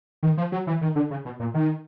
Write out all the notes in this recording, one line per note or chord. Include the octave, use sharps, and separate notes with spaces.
D#3
F3
F#3
E3
D#3
D3
C#3
B2
A#2
D#3